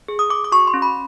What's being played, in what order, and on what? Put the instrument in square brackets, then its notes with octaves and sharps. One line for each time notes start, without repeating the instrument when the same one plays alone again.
[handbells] G#4
D#6
G#4 D6
D6
F#4 C#6
C6
C#4
B5